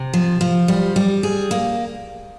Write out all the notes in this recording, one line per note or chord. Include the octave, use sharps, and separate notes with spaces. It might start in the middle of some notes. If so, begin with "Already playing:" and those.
Already playing: C3
F3
F3
G3
G3
G#4
A#3